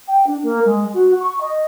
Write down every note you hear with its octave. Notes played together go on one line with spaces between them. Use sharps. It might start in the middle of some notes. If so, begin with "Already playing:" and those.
G5
D4
A#3
G#3
F#4
C#6
D#5